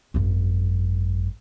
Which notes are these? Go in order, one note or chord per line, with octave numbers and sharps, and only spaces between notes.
G#1 F#2